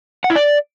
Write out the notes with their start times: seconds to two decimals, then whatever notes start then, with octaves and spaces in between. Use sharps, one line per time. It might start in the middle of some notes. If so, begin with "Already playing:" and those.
0.24 F#5
0.30 E4
0.36 D5